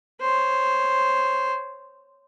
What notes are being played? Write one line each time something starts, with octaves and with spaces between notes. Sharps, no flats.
C5 C#5